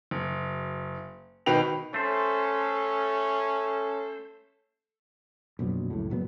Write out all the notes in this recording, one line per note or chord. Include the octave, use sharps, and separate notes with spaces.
F#1
G#1 B2 D#3 B4 G5 F7
A3 C#4 A4 C5
A#1 F#2 B2 F#3
C#2 F#2 A2
F#1 A#2 F#3 B3